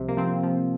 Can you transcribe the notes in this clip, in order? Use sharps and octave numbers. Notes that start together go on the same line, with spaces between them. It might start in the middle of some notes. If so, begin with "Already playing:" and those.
Already playing: C2 C3 F3
A#3
F3 C4
F3